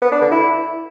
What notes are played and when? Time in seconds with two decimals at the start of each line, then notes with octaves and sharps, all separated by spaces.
0.02 B3
0.12 D4
0.22 D3
0.32 E4